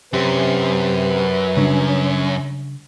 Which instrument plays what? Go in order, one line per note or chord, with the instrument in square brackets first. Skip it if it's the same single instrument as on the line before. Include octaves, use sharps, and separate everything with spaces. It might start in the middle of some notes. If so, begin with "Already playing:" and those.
[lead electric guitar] F#2 [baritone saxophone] C3 [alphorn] B4
[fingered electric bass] C#3 G3 D4 [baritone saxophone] C#4